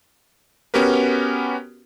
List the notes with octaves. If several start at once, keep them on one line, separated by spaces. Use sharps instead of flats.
B3 C#4 F#4 G4 A#4 B4